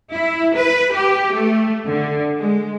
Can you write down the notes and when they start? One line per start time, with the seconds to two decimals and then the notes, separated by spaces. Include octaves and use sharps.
0.13 E4
0.56 B4
0.93 G4
1.33 A3
1.87 D3
2.39 G#3